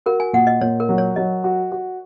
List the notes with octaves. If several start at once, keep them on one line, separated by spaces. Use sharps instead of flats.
F#4 A#4
G#5
A#2 F#5
D#5
A#2 C#5
A#4
F#3
C#5
F#3 D#5
F#4
F#4